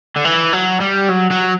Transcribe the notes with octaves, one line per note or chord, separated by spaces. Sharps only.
D3
E3
F#3
G3
F#3
F#3